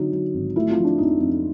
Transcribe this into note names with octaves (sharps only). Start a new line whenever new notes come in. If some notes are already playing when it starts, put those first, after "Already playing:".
Already playing: D3 F#3 D#4
F#3
G#1
A3 E4
F4
F3
D4
F2 D#4
F2